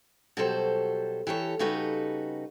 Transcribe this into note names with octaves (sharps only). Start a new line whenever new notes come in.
B2 F#3 G3 A4 C5
E3 G4 A4 C#5
C#3 G3 D#4 F#4 A4 B4